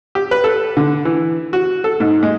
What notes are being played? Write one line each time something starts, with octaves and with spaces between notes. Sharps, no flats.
G4
B4
A4
D3
E3
F#4
A4
G#2
G#3